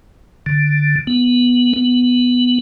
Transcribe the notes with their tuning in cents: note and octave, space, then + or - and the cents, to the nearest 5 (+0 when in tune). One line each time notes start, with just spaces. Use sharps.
D3 +5
B3 -5
B3 +5